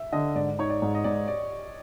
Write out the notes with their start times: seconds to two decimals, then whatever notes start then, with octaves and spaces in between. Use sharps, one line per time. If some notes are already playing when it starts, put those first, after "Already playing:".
Already playing: E5
0.13 D3 D#5
0.35 G#2 D5
0.59 D#4 C#5
0.70 D5
0.82 G#2
0.95 D#5
1.04 G#2 D5
1.28 D5